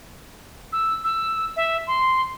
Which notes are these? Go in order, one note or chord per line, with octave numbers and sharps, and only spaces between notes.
E6
E6
E5
C6